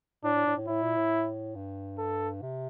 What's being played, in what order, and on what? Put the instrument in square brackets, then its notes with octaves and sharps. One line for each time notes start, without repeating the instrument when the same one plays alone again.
[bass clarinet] A2 [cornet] D4
[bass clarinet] A2
A2
A2
[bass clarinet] A2 [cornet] E4
[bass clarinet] A#2
A2
G2
[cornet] A4
[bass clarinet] C3